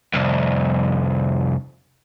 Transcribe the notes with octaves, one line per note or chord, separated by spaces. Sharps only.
C2 F2